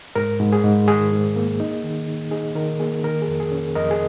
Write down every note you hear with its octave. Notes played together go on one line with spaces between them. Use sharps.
G#2 A#4
G#2
G#4
G#2
D#3 G#4
G#2
A#3
D#4
D#3
D#3
D#4 G#4
D#3 A#4
A#3 G#4
D#3 A#4
G#4
F2
G#4
C#4
F2 A#4 D#5
G#4